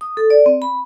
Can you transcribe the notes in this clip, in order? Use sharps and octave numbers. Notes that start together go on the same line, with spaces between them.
D#6
A4
D5
C4
B5